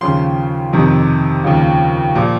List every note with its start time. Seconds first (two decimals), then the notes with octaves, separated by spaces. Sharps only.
0.01 D#2 C#3 F3 C6
0.73 F2 C3 D#3
1.44 D#2 C#3 F3
2.15 A#2 F3